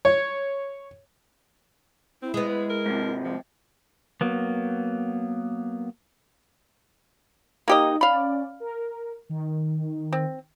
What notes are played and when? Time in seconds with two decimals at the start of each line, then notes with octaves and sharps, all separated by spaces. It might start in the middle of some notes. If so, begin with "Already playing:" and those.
0.05 C#5
2.22 C4 E4
2.34 G#3 B3 D#5
2.49 B4
2.70 A#4
2.86 G#2 C3
3.24 F3
4.21 F#3 A#3 B3
7.68 A#3 D#4 G4 D#5
8.01 C#4 D5 F5 B5
8.60 A#4
9.29 D#3
10.13 C4